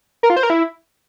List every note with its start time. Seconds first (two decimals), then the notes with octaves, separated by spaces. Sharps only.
0.23 A#4
0.30 F4
0.36 C5
0.43 A#4
0.50 E4